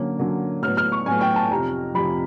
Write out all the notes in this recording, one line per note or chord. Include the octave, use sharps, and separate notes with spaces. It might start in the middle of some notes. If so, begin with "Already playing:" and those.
Already playing: D3 F#3 A#3 C#4
D3 F#3 A#3 C#4
A2 F#3 B3 F6
F6
C#6
A2 F#3 B3 G#5
G5
A5
F2 C3 F3 A#5
F2 C3 F3 B5